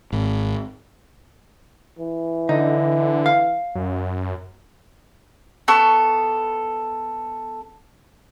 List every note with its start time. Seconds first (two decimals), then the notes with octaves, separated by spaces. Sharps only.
0.12 G#1
1.99 E3
2.49 D3 D#4
3.26 F5
3.75 F#2
5.68 B3 A4 C#6